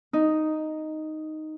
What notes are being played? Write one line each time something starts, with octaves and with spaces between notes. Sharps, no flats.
D#4